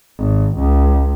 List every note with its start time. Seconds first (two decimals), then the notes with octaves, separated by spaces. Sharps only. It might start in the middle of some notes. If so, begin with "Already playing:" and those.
0.18 G#1
0.57 C#2